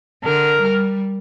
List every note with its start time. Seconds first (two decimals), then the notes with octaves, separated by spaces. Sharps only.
0.24 D3 A#4
0.61 G3